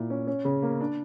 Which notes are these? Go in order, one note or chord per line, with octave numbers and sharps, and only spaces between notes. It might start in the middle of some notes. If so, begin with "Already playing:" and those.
Already playing: A#2 E4
C#4
C#4
C#3
A#3
D4